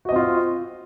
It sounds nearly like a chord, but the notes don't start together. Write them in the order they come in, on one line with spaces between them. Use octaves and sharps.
F#4 D#5 C4 F4